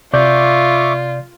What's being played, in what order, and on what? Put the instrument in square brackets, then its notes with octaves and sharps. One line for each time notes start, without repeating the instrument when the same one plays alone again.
[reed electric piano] C3 D5 G6 [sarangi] F4 [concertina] E5 C#6 D6